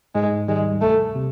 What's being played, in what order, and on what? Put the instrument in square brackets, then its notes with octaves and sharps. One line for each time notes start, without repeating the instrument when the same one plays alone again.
[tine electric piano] G#2 [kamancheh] G#3
[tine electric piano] D#3 G3 [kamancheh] G#3
[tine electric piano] C2 [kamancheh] A3
[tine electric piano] C3